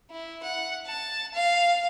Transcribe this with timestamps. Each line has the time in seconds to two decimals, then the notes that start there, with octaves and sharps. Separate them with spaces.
0.11 E4
0.43 F#5
0.86 A5
1.34 F5